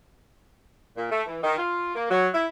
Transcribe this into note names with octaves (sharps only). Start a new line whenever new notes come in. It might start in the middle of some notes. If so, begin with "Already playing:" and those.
A#2
A3
E3
D#3
F4
A#3
F#3
E4